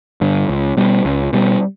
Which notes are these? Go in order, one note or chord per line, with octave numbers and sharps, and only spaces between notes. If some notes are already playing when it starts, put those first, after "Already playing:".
G2 D3
C#2
B2 G3
C#2
B2 G3